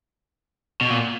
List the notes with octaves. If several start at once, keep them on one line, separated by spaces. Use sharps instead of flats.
B2
A#2